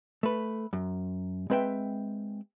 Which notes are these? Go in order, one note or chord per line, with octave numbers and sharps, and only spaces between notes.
A3 B4
F#2
G#3 C4 B4 E5 G5